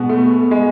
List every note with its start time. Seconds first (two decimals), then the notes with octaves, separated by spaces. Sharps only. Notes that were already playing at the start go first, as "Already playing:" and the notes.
Already playing: B2 G#3 B3
0.09 A3
0.51 G#3